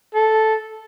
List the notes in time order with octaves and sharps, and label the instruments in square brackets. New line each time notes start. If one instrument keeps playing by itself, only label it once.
[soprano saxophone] A4